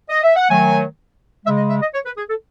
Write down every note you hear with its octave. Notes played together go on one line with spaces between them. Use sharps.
D#5
E5
F#5
D#3 F#3 A3 G#5
C#3 G#3 E5
D#5
E5
D#5
C#5
B4
G#4
A4